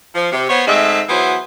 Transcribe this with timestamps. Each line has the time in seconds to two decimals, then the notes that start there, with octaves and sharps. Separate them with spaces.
0.15 F3
0.32 C3
0.49 B3 C5 C#5
0.67 G#2 G#3 A3 C4 E5
1.09 E3 F#3 B3 G#4 C5